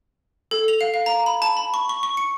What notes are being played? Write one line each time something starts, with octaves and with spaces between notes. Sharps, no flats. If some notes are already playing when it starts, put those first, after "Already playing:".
A4
F7
F5
F5
A#5
B5
A5
B5
C#6
C#6
C#6
C#7